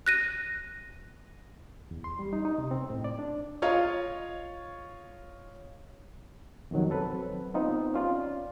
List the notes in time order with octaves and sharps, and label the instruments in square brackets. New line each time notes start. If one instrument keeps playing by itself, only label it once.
[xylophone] F#6 A#6 D#7
[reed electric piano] E2
C6
G3
D#4
D#4
C3
C4
A2
D5
D4
[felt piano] F4 C#5 D#5 F5
[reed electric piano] F2 B2 D#3 F#3
F#3 C4 A4 B4
B3 C4 D#4 F4
C#4 F4 D5